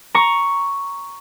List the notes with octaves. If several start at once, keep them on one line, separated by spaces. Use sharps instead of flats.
A#5 C#6